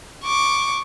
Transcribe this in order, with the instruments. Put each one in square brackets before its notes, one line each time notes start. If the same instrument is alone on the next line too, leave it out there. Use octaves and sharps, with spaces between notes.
[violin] C#6 D6